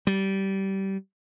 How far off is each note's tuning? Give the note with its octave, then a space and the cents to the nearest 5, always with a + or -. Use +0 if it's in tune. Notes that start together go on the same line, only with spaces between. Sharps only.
G3 -20